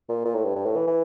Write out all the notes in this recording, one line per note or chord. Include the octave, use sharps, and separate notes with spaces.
A#2
A#2
A2
G2
G2
A2
E3
E3